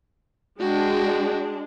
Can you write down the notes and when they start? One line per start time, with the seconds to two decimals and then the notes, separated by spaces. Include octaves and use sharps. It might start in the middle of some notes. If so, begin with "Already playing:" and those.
0.61 G#3 D4 F#4 G5